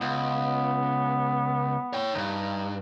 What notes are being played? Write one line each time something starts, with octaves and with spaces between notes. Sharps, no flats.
C#2 B3
C#5 G5
D2 G2 D#4